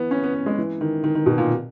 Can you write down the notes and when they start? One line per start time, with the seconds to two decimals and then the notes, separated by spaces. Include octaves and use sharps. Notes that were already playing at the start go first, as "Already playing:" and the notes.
Already playing: E3 B3
0.11 C#4
0.23 B3
0.34 B3
0.46 G#3
0.58 E3
0.81 D#3
1.04 D#3
1.15 D#3
1.26 B2
1.38 A#2